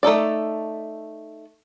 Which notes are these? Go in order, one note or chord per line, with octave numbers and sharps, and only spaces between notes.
A3 D#4 A4 D5